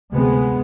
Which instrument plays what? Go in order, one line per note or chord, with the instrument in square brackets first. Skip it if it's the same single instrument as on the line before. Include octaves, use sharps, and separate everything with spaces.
[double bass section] D2 C3 G#3 B3